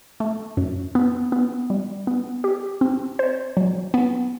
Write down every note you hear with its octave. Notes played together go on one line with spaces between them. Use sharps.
A3
F#2
B3
B3
G3
B3
G4
C4
C5
F#3
B3